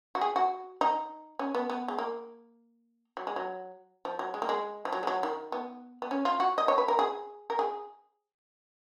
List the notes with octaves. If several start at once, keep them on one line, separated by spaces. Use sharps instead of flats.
F#4
G#4
F#4
D#4
C#4
B3
B3
G#3
A#3
F#3
G#3
F#3
F3
F#3
G#3
A#3
G#3
F3
F#3
G#3
F#3
D#3
B3
B3
C#4
F4
F#4
D#5
C#5
B4
A#4
G#4
A#4
G#4